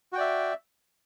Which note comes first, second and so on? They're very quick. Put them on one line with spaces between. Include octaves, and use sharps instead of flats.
F#4 G5 D5 E5